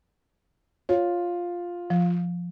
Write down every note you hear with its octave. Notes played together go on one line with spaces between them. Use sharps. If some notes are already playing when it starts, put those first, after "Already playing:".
F4 C#5
F3